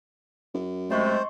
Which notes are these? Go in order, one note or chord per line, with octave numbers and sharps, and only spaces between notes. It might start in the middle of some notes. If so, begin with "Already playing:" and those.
F#2
C3 G#3 A3 C5 D#5 C6 C#6